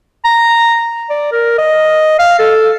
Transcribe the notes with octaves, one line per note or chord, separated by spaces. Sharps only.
A#5
D5
A#4
D#5
F5
A4